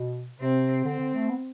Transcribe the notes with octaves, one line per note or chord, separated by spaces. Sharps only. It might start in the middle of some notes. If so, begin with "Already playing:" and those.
Already playing: B2
C3 C4
D3 C4
D3
A3
B3